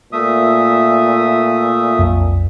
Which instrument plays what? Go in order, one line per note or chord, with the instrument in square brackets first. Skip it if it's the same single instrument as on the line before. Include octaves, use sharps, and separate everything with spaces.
[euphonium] A#2 [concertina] A3 E5 D#6
[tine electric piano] B1 F2